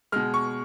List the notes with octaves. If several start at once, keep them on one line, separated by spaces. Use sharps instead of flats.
B2 G#3 F6
C#6